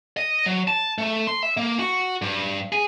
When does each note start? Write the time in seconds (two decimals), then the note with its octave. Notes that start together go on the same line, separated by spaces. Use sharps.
0.17 D#5
0.46 F#3
0.68 A5
0.98 A3
1.27 C6
1.43 E5
1.57 A#3
1.79 F#4
2.22 G2
2.72 G#4